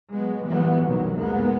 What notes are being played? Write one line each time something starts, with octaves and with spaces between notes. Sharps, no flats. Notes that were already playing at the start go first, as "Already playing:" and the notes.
F#3 G#3 B3
A#2 E3 F#3 G3 B3
C2 F#2 B2 D#3 F#3
F1 C2 G#3 A#3 B3